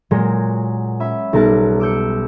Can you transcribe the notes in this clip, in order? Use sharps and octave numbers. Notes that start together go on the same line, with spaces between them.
A#2 F#3 G#3 A#4
C#4 E5 B5
B1 G3 A#4 A5 F#6 A6
D6 E6 G6 C#7